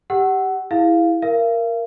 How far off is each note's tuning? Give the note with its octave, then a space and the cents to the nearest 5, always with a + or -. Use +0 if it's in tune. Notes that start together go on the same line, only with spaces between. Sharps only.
G4 +0 F#5 +20 E6 +0
E4 +0 G#4 -10 F5 +0
A#4 +0 F5 -40